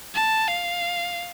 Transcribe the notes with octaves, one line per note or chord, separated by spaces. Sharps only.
A5
F5